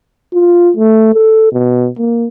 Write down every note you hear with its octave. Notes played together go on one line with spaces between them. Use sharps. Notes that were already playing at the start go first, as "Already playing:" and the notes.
F4
A3
A4
B2
A#3